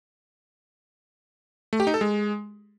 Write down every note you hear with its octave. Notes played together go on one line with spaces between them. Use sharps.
A3
G4
D#4
A4
G#3